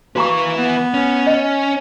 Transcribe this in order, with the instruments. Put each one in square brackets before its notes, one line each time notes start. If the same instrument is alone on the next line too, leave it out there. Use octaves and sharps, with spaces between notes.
[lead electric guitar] E3 B4 [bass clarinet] A#3 [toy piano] F#4 A#5 C#6
[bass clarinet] B3
[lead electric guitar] C#4
[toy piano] D#5